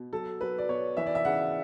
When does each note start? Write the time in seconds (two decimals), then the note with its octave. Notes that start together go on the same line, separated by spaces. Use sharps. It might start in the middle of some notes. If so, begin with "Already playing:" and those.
Already playing: B2
0.13 F#3 A4
0.41 F#3 B4
0.58 D5
0.69 B2 C#5
0.97 E3 E5
1.06 D5
1.15 E5
1.25 C#3 F#5